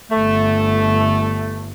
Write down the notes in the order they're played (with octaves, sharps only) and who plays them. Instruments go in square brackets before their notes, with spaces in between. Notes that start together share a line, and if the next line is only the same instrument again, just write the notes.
[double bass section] G1 [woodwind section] A3